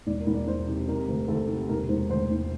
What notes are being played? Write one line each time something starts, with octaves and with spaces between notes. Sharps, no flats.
E1 D5
A#4
E1
D5
E1 C5
C3
C3 A#4
D2
D2 A4
C3
E1 A#4
E1 C5
D2 C5
E1